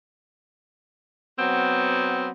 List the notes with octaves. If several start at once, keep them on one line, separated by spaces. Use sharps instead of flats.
F#3 B3 C4